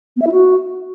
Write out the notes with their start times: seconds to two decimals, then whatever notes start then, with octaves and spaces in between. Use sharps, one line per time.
0.16 B3
0.22 E5
0.27 E4
0.32 F#4